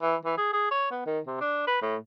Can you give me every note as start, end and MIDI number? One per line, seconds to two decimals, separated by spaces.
0.02 0.16 52
0.25 0.36 52
0.38 0.52 68
0.53 0.66 68
0.71 0.87 73
0.91 1.03 59
1.06 1.20 51
1.27 1.37 48
1.41 1.63 62
1.67 1.79 71
1.82 1.96 45